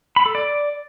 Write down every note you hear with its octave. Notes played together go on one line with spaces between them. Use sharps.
B5
A4
D5